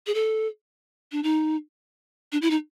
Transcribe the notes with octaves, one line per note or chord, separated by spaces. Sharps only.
G#4
A4
D4
D#4
D4
E4
D#4